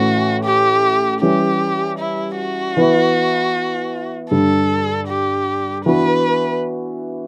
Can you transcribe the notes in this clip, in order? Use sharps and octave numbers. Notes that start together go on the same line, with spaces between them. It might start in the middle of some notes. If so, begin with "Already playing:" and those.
Already playing: A2 E3 A3 C#4 E4 F#4
G4
E3 G3 C#4 G4
E4
F#4
E3 B3 E4
G2 D3 G3 A4
G4
E3 B3 D4 F#4 B4